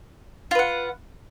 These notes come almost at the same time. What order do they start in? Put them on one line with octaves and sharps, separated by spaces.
F4 B4 F#5